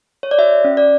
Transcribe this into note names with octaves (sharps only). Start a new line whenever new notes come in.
C#5
D5
F#4 E5
C#4
D5